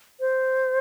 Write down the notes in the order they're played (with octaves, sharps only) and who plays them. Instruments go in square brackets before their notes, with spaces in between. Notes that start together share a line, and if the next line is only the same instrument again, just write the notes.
[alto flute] C5